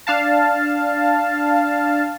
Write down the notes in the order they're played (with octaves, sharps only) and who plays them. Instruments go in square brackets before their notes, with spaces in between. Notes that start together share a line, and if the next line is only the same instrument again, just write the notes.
[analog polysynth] D4 F5 A5